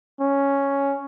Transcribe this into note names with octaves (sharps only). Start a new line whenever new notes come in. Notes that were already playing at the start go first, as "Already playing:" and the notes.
C#4